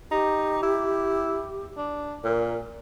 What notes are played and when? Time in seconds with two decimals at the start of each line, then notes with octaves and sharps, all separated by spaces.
0.11 D#4 G4
0.63 E4
1.77 D4
2.24 A#2 A#4